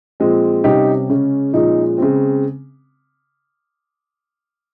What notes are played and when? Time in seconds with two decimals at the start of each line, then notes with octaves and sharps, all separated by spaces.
0.20 A#2 F3 G#3 C4
0.64 C3 G3 C#4 D#4 G4
1.09 C#3 G#3 C#4
1.54 A#2 F3 G#3 C#4 D#4
1.98 C#3 G#3 C4